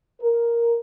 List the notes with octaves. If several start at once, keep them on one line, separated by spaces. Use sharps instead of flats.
A#4